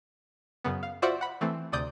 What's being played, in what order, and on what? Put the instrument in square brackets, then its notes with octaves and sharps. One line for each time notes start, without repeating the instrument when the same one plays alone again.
[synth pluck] F#2 C#3 B3
F5
F4 F#4 C5 D5 E5 F#5
F#5 B5
E3 A3 C4
D2 C3 D5 D#6 G6